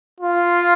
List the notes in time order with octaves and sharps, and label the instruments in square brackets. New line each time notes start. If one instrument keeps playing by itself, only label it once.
[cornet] F4